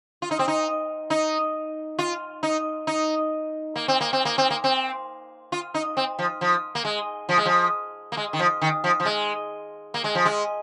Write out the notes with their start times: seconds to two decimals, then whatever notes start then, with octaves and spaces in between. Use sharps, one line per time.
0.22 F4
0.31 D#4
0.39 C4
0.48 D#4
1.10 D#4
1.99 F4
2.43 D#4
2.87 D#4
3.76 A#3
3.88 C4
4.01 A#3
4.13 C4
4.25 A#3
4.38 C4
4.50 A#3
4.64 C4
5.52 F4
5.74 D#4
5.97 C4
6.19 F3
6.41 F3
6.75 A#3
6.85 G#3
7.29 F3
7.38 G#3
7.45 F3
8.12 A#3
8.17 G#3
8.33 D#3
8.39 F3
8.62 D#3
8.84 F3
9.00 F3
9.05 G#3
9.94 A#3
10.04 G#3
10.15 F3
10.25 G#3